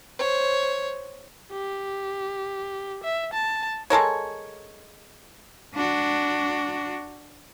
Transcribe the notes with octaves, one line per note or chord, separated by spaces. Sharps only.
C5 C#5
G4
E5
A5
G#3 A4 A#4 C#5
D4 F#4